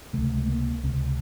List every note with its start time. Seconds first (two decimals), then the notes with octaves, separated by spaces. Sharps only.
0.13 C#2 C3 A3
0.38 A3
0.49 A#3
0.83 C#2 C3 C4